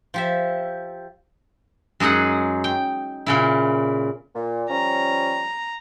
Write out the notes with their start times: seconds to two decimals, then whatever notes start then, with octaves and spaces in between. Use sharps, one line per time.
0.14 F3 G4 E5
2.00 F#2 G#3 D#4 G#4 F#5
2.64 G5
3.26 A#2 C#3 E4
4.35 A#2
4.70 F3 G3 C#4 A#5